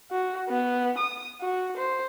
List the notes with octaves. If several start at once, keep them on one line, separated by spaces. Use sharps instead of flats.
F#4
B3
D#6
F#4
C5